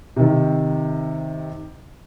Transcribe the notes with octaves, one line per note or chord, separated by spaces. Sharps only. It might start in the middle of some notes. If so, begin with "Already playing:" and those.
C3 D#3